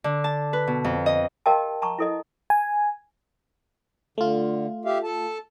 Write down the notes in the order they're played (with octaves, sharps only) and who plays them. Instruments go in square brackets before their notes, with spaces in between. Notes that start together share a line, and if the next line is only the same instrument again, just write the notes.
[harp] D3
A5
B4
B2
F2
D#5
[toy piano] G4 A#4 D#5 F5 G5 A5
A5 A#5 C#6
E4 A4 D#5
[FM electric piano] G#5
[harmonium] D3 [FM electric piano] A3 F4
[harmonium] G4 E5 F5
A4 A5